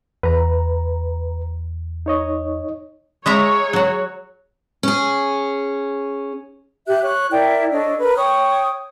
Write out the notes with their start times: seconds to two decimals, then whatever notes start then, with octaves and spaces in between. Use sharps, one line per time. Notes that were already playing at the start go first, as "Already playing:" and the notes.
0.23 E2 B4 A#5
2.06 D#4 C#5 D#5
3.26 G#3 G#4 C#5 E5 A#5
3.73 F#3 F#4
4.83 C#4 G#4
6.86 G4 E5 F#6
7.01 C#5 F#6
7.31 E4 A#4 D5 G5
7.72 D4 A4 C#5 D#5
7.99 A#4 B4
8.16 C#5 G5 D#6